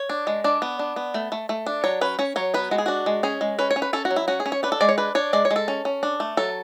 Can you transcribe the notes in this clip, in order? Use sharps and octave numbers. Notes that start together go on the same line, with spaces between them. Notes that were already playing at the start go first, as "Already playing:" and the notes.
Already playing: C#5
D4
G#3
D4 D5
B3
D4
B3
A3
A3
A3
D4
F#3 C#5
C#4 B4
C#4 C#5
F#3 C#5
B3 B4
G#3 F#4
G#4
D4 F#4
G#3
C#4 G#4
G#3
C#4 B4
C#5
C#4
B4
C#4 A4
F#4
F#3
E4
C#4 F#4
G#4
C#4
C#5
D4 B4
A4
G#3 D5
C#5
D4 B4
D4 C#5
G#3 D5
C#5
G#3
A4
C#4
C#4
D4
A3
F#3 A4